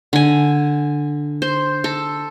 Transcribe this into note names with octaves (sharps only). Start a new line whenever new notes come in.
D3 G#5
C5
A4